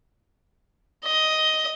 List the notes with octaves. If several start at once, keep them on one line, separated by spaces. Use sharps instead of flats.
D#5